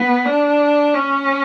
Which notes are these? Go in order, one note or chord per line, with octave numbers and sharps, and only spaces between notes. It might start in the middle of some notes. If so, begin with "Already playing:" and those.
Already playing: B3
D4
C#4